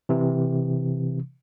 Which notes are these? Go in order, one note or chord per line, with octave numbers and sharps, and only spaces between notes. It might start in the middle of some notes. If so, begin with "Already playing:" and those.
C3 E3